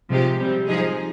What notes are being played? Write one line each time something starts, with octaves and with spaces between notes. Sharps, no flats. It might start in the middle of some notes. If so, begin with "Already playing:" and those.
C3 F3 G#3 D#4 G4
C3 G3 C4
F3 G#3 D#4 G#4